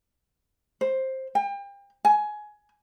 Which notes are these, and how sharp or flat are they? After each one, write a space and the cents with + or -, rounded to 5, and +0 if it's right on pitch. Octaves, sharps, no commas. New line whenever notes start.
C5 +10
G5 +35
G#5 +15